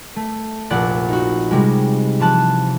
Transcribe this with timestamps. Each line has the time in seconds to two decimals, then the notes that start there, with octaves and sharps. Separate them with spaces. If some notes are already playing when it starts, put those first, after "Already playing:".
0.16 A3
0.70 F1 A#1 D5 F#5 A6
1.09 D#4 F#4
1.51 C3 G3 G#3
2.20 E3 F3 A5 F#6